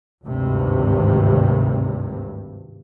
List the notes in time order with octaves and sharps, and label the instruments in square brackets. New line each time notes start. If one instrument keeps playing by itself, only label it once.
[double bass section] G#1 D2 G2 C3